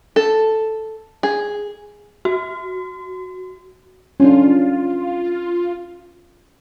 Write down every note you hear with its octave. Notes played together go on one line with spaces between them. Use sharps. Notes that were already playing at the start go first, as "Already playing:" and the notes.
A4
G#4
F#4
C#4 D4 F4